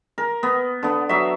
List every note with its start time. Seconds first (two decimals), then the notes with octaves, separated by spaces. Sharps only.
0.18 A#4
0.43 B3
0.83 D3 B3
1.09 F#3 E5